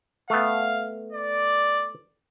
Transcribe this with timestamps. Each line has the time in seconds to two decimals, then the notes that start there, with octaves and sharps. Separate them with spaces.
0.30 A3 B3 F5
1.13 D5